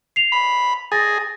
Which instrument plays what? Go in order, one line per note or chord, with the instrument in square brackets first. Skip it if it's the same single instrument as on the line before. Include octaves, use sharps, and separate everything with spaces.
[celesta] C7 F7
[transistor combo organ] B5
[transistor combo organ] G#4 [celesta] A6 A#6